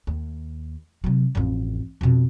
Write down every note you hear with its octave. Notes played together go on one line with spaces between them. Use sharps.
D#2
C3 F#3
A1 F2
F2 B2